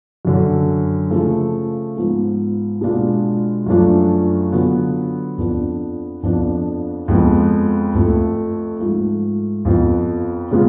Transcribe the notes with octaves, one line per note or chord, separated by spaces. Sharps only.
F#2 D3 F#3
C#3 F3 A3
G#2 F3 B3 F4
B2 G#3 B3 D4 F4
F#2 F3 A3 D4 F4
D3 F#3 B3 F4
F2 F3 B3 D4
F2 F3 B3 D4
F2 F3 G#3 B3
F2 F3 A3
G#2 F3 A3 F4
F2 F3 B3
C#3 G#3 B3 F4